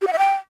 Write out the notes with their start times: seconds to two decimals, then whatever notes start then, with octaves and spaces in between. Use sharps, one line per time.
0.01 G4
0.07 F#5
0.13 E5
0.18 G5